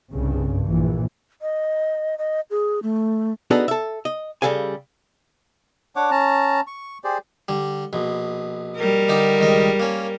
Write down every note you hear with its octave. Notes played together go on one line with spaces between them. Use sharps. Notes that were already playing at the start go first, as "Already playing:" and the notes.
C2 G2 C#3
A#1 E3
D#5
D#5
G#4
A3
B3 D4 D#4 F#4 G#4 A4
A4 E5
D#5
C#3 G3 A4 F5 G#5
D4 C#5 F#5 D6
C#4 A5 A#5
C#6
G4 G#4 C5 D5
D3 G3
A#1 B2
G3 A#4
D3 D#4 G4
C#2 D#3 D#5
A#3 C#4